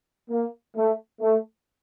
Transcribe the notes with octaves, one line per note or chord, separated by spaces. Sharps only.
A#3
A3
A3